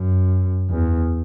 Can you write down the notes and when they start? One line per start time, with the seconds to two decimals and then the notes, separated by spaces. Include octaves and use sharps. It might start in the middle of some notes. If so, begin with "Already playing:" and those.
Already playing: F#2
0.70 E2